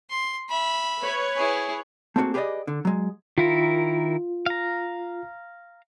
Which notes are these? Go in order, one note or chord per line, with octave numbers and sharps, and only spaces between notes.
C6
E5 B5
B4 C#5
E4 G#4
A3 A#3 C4 D4 F#4 G#4
G4 G#4 B4 C5 D5 D#5
D3
F#3 G#3
D#3 E4 F4 A#4
F5 A#5